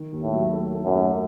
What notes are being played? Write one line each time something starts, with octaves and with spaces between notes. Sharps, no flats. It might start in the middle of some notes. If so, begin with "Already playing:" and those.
Already playing: D#3
D#2
A2
F#3
A3
A3
F#2
A3